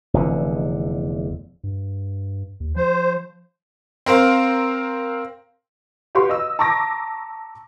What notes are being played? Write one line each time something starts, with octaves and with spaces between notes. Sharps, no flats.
F1 E2 D3
G2
D#2
F3 C5
C4 A#4 C5 F5
F#4 G4 B4 F5 C6 C#6
D#5 E6
A5 A#5 C#6 D6 A#6